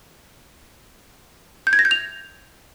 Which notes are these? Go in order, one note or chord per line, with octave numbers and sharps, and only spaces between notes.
G6
G#6
A#6
G6
F7